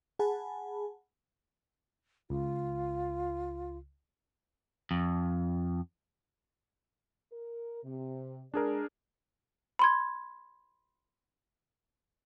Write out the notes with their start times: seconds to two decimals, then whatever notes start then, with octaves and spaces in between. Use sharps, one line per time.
0.19 G#4 F#5 G#5 A5 B5
2.30 C#2 F4
4.91 F2
7.33 A#4
7.84 C3
8.54 G#3 D4 G#4 A#4 D5
9.79 B5 C6 G#6